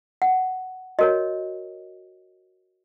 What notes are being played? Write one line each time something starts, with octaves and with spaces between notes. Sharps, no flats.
F#5
F#4 A#4 C#5 D#5